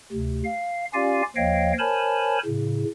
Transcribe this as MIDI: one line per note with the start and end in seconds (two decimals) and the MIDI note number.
0.12 0.42 38
0.12 0.42 48
0.45 0.85 77
0.94 1.22 61
0.94 1.22 65
0.94 1.22 67
0.94 1.22 74
0.94 1.22 77
0.94 1.22 80
1.36 1.73 39
1.36 1.73 53
1.36 1.73 73
1.36 1.73 75
1.36 1.73 77
1.36 1.73 79
1.79 2.38 70
1.79 2.38 72
1.79 2.38 73
1.79 2.38 80
1.79 2.38 81
1.79 2.38 83
2.45 2.84 45
2.45 2.84 49